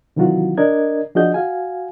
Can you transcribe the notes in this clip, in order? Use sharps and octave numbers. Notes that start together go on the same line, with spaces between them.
C3 D#3 E3 F#3 F4 F#4
D4 A#4 D5 D#5 G#6
F3 D4 F#4 G#4 D#5 G6
F#4 F5 G#5